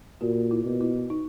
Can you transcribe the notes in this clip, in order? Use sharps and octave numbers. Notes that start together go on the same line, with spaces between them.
A#2 F#4
E4
B2
E4
D#4